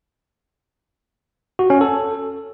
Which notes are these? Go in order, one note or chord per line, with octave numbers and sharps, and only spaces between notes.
F#4
C#4
A4